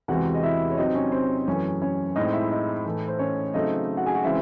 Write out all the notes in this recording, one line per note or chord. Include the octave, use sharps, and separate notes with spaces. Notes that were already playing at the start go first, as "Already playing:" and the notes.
E2 C3 E3 G#3 F#4 F#5
D#5
E4 E5
C#5
C3 F#3 C4 D#4 D#5
C#4 C#5
C4 C5
F#2 E3 A3 C#4 C#5
C#4 C#5
A2 G#3 C4 D#4 D#5
E4 E5
D#4 D#5
A2 E3 A3
C5
C#4 C#5
C#3 F#3 A3 C4 D#4 D#5
F#4 F#5
G#4 G#5
F#4 F#5
C#3 E3 G#3 C4 E4 E5